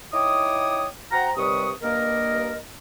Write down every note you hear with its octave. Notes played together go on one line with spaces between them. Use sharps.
D#4 E4 C#5 G5 D6 D#6
F#4 C5 F#5 G5 A#5
D#2 C3 G3 B4 C#6 D#6
G2 A#3 A#4 D#5